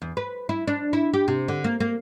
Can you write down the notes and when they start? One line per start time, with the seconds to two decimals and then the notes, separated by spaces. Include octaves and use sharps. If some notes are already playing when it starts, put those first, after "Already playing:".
0.02 E2
0.17 B4
0.49 E4
0.67 D4
0.93 E4
1.14 G4
1.28 C3
1.48 D3
1.64 A#3
1.80 A#3